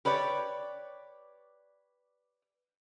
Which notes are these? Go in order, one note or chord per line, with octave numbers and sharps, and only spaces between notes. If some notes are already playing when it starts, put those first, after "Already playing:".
G4 B4 C#5 D5